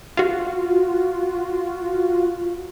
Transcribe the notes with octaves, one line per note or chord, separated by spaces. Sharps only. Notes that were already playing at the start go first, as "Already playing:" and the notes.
F4 F#4